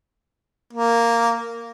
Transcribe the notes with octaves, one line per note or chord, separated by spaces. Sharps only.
A#3